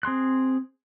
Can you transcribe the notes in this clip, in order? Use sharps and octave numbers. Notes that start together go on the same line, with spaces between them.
C4 G#4 C6 F#6